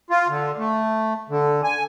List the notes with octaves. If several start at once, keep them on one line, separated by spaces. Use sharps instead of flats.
F4
D3
A3
D3
G#5